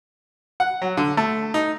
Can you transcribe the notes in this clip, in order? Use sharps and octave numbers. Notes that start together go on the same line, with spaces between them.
F#5
F#3
D3
A3
D#4